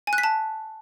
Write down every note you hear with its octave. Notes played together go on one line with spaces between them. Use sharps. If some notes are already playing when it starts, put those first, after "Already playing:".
G#5
F#6
B6
A5